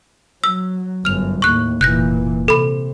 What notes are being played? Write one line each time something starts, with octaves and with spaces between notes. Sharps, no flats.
F#3 E6
G1 F#2 F6 F7
D#2 A2 C#6 F#6
F1 A#2 E3 F#6 G6 A#6
C3 A4 B5